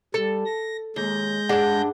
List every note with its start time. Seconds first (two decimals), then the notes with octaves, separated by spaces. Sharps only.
0.14 G3 A4
0.45 A#6
0.96 D#2 G#3 G6 A#6
1.49 G2 D4 G#4 F#5